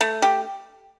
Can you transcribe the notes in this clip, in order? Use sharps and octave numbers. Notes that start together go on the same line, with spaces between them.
A3
G4